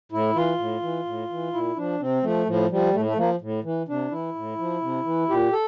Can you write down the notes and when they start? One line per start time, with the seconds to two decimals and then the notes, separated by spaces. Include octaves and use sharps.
0.12 A2 E4
0.35 E3 F4
0.58 A2
0.82 E3
1.05 A2
1.30 E3
1.53 A#2 E4
1.76 F3 D4
2.00 C3 C4
2.23 F3 A3
2.46 A2 F3
2.71 F3 G3
2.93 A2 A3
3.05 A3
3.17 F3 A#3
3.41 A2
3.64 E3
3.88 C3 D4
4.11 E3 E4
4.35 A2
4.58 F3
4.81 C3
5.05 E3
5.29 A#2 G4
5.53 A4